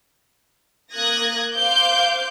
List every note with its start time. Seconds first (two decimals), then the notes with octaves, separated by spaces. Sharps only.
0.93 A#3 D#6 F#6 G#6 A#6
1.53 C5 F5 D6 G6